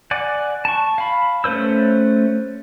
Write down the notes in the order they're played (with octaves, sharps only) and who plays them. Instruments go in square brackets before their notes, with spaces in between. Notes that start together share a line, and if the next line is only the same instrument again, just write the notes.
[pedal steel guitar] D5 F#5 G#5 D6
A5 C#6
F5 B5
A3 C#4 B4 C5 E6